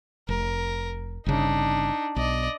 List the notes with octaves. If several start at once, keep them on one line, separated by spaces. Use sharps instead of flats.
F1 A#4
G1 C#3 D4 D#4
B1 D5 D#5